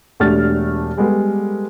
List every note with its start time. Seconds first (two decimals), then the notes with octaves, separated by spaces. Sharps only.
0.20 E1 A3 D4 G4 F6 A6
0.97 G3 G#3 B3 G4 A4 B4